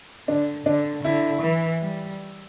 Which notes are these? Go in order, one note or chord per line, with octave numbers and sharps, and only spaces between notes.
D3 D4
D3 D4
D3 E4
E3
G3